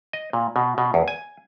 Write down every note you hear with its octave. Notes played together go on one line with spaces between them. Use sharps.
D#5
A#2
B2
B2
E2
G#5